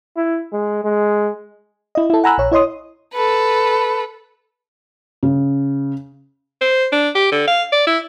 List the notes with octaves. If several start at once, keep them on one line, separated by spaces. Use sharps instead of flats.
E4
G#3
G#3
E4 D#5
E4 A4
F#5 G#5 A#5 B5 E6 F#6
A#1 C#5
E4 C#5 D#5 C6 D#6
A4 B4
C#3
C5
D4
G4
D3
F5
D5
E4